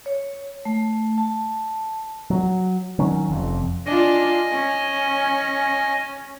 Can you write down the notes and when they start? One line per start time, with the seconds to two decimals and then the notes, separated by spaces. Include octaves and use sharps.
0.06 C#5
0.65 A3
1.18 A5
2.30 F#3
2.99 D#3 F#3 C#4
3.29 F1 F2
3.86 D4 F4 D#5 G#5
4.52 C#4